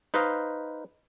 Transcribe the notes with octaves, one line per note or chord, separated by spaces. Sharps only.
D#4 B4 C5 D#5 F5